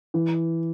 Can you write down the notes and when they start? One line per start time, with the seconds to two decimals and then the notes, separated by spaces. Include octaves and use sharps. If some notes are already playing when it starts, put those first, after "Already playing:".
0.14 E3